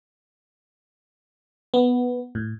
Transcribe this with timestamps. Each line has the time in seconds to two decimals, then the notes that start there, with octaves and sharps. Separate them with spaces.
1.74 B3
2.35 A2